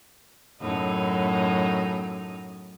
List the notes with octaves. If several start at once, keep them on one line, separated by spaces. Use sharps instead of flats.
F#2 A2 D#4